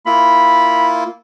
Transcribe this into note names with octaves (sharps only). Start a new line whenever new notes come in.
A#3 E4 F4 B5